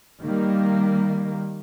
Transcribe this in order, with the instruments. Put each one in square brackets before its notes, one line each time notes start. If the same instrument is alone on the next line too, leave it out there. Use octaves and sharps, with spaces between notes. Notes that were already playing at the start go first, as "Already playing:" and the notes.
[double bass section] D#3 G3 A#3